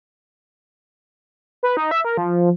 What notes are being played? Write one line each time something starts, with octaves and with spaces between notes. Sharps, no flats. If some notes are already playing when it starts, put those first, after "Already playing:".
B4
D#4
E5
A#4
F3